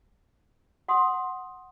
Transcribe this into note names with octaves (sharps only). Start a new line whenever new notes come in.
F#5 C6 D#6